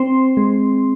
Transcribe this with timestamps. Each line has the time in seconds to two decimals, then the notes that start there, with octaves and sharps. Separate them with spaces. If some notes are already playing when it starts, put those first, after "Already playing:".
Already playing: C4 C6
0.37 G#3